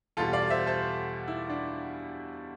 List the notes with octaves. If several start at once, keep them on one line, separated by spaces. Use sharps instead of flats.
E2 B2 G3 F4 A4
D5 F5
C5 E5
A4 C5
E4
D4